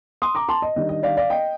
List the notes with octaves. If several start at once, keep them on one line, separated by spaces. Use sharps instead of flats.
C6 D#6
A#5 D6
A5 C6
D#5
D#3 G3 D4 D#5
D#5
D5 F5
D5 F5
D#5 G5